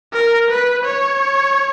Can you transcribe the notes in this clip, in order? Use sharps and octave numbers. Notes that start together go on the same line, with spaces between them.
A#4
B4
C#5